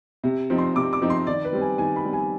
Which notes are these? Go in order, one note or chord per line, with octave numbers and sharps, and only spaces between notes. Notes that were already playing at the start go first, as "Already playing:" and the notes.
C3
F3 C4 D#4
C6
C3 D6
D6
F3 C4 D#4
C6
D#3 D5
B4
G3 C4
G#5
D#3 G#5
B5
G3 C4
G#5